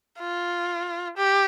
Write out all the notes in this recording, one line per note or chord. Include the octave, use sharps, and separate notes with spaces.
F4
G4